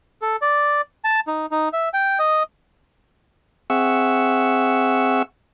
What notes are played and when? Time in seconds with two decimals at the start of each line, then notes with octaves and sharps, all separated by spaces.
0.22 A4
0.42 D5
1.04 A5
1.27 D#4
1.51 D#4
1.73 E5
1.94 G5
2.19 D#5
3.70 C4 G#4 E5 F#5 C#6 E6